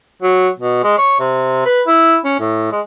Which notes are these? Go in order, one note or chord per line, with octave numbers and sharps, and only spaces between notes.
F#3
B2
G#3
C#5
C3
B4
E4
C#4
A2
G#3